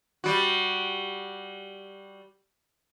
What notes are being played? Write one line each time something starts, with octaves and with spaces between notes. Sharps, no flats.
G3 F#4